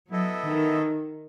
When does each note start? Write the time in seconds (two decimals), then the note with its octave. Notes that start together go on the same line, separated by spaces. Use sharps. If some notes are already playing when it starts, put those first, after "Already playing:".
0.10 F#3 B3 E4 A4 D#5
0.46 D#3